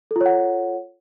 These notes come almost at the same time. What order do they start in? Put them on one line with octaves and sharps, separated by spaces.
A4 F4 C#5 F#5